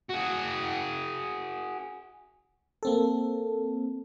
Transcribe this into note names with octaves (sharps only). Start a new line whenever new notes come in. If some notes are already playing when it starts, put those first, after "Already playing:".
F#4 G#4
A#3 C4 A4